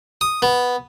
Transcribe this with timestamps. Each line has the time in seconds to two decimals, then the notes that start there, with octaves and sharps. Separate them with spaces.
0.21 D#6
0.42 B3